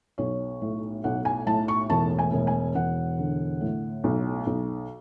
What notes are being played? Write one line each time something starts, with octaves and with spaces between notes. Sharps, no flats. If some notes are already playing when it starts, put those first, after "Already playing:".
B1 C#5
A2
B1 F#5
G#5
A2 A5
C#6
E1 A5
G#5
E1
G#5
E1 F#5
D3
A2
B1
B1